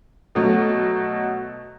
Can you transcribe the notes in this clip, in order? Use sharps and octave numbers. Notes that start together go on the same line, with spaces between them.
B2 F#3 A3